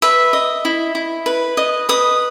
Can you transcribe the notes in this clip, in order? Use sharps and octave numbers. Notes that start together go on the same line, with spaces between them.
B4 E5
D#5
E4
E4
B4
D#5
B4 D#6